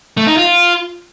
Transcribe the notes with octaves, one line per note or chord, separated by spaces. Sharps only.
A3
D#4
F4